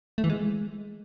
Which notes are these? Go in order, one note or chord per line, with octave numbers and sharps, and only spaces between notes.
A3
E3
G#3